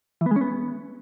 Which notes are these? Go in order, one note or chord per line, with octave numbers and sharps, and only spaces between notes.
E3
B3
G#3
C#4
B3